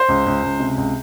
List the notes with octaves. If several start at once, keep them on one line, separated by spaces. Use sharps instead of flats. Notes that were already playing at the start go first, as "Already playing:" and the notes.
Already playing: C5
C#2
C#2
C#2
C3
C#2